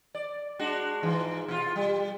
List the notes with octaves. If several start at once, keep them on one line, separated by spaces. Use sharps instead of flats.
D5
G#3 D4 F#4
G#2 E3 F4
B2 F4
G3